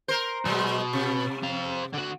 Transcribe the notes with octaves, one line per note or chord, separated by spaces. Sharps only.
A#4 C5
B2 F#3 G#3 F#4
C3
C4 F5
D3 F#4